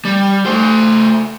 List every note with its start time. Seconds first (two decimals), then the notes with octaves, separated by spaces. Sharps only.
0.05 G3
0.46 A3 C5